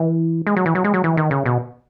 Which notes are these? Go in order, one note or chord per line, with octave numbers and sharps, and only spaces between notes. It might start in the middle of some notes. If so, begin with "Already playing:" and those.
Already playing: E3
G#3
F#3
E3
F#3
G#3
F#3
E3
D#3
C#3
B2